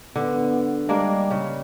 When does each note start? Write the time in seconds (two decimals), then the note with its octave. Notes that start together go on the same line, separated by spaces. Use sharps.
0.16 D3 B3
0.89 G3 G#3 A#3 D4
1.31 C#3